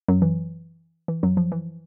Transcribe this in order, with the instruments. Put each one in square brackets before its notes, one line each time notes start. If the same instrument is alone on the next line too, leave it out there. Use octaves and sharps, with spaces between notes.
[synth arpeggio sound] F#2 F#3
E3
E3
F#2 F#3
F3
E3